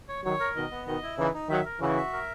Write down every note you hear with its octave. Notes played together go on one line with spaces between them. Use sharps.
C#5
D#3 F#3 C#5
A#4
B2 D#3 D#5
B3
B2 D#3 D#5
E4
C#3 E3 D#4
D#4
D#3 F#3 E5
A#4
C#3 E3 F#4
E5
A#4